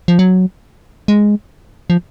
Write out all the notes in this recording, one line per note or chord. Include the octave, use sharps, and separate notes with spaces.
F3
F#3
G#3
F3